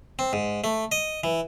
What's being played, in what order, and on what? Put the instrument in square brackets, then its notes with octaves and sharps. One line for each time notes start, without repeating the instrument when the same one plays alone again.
[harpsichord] C4
G#2
A3
D#5
E3